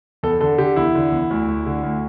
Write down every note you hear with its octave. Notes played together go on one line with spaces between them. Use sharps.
E2 A4
D3 A4
D3 G4
E2 E4
D3
E2
D2
D2
D3
D2